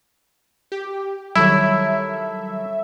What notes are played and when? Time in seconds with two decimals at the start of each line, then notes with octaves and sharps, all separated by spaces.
0.72 G4
1.36 D#3 F#3 G3 E4 A4 A#4 C#5 E5